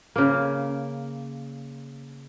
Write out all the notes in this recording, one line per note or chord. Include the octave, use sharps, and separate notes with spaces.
C#3 A#3